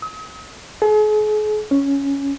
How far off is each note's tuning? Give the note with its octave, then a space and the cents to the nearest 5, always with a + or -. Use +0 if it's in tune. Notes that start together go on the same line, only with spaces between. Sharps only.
D#6 +45
G#4 +40
C#4 +5